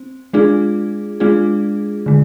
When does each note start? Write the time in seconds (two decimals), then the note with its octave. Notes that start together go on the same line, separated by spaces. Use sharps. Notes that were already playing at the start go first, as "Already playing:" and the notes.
Already playing: C4
0.33 G#3 D4 F4 G#4
1.20 G#3 D4 F4 G#4
2.06 D3 G#3